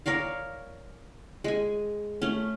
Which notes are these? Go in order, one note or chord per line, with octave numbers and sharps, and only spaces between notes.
A#4 C#5 D5 F5
G#3 G#5
A3 C#4